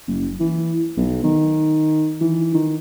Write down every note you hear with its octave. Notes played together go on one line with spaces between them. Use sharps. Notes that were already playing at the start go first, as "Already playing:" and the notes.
F#1
E3
B1
D#3
E3
D#3